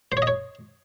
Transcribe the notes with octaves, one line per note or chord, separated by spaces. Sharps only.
C5
C#5
D#5
C#5